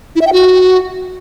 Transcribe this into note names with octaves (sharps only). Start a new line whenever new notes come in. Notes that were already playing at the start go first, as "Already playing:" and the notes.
E4
E5
G5
F#4